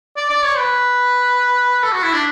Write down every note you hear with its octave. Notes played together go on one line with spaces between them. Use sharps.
D5
D5
C#5
B4
A4
F#4
E4
D4